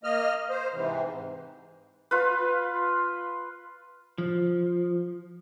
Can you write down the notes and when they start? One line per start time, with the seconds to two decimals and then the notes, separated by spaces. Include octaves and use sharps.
0.04 A#3 D#5 F6
0.50 C5
0.74 G#2 C3 E3
2.11 F4 B4
4.18 F3